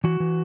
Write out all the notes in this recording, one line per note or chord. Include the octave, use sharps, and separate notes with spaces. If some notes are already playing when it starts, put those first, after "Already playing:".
E3 F#4
E3